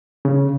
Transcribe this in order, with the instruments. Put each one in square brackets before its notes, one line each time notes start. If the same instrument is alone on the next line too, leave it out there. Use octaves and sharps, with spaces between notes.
[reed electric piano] C#3